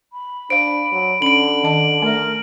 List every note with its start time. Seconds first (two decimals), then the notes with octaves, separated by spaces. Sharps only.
0.13 B5
0.50 D4 C5 F5 D7
0.93 F#3
1.22 D3 C#4 D7 F#7
1.63 D#3 A5
2.02 A3 A#4 E5